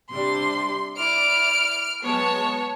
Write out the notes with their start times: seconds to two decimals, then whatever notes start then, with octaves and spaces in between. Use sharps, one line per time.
0.10 C3 G3 D4 C6
0.97 E4 D5 F6 D7
2.03 F#3 G#3 B3 C#5 A5